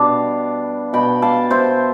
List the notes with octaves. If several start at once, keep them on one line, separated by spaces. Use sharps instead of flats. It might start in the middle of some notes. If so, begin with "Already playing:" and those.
Already playing: B2 G3 B3 D4 D5 F5 A5
B2 B3 G5 B5
F5 A5
C5 E5